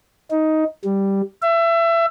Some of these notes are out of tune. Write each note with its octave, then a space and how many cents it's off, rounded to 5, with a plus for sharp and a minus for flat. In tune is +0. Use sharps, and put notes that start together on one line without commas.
D#4 +10
G3 +0
E5 +25